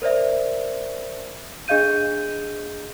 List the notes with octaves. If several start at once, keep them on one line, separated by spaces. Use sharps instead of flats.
A#4 C5 D5 E5
D4 G#4 D#5 F5 G6 D#7